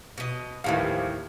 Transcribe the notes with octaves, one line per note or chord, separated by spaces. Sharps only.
B2 D#5
D#2 A2 E3 F3 G3 F5